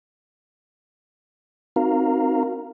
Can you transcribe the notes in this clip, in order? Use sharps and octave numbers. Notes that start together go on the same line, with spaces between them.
C4 D#4 F#4 A#4 F5 A#5